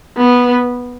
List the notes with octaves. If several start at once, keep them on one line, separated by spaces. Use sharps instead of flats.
B3